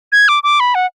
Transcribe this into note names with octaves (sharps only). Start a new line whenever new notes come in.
G#6
D6
D6
B5
F#5